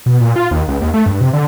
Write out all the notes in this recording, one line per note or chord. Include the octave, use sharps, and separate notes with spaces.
B2
A#2
F4
D#2
C#2
D#2
A3
G2
C3
D3